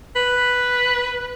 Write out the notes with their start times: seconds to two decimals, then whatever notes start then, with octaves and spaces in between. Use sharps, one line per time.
0.16 B4